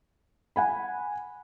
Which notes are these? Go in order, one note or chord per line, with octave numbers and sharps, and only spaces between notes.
F#5 G#5 B5